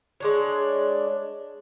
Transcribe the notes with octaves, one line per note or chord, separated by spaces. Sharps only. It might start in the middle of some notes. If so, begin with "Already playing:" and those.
G#3 D4 C#5